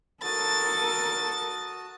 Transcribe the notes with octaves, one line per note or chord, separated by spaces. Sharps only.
F#4 A4 A#4 A5 D#6 A6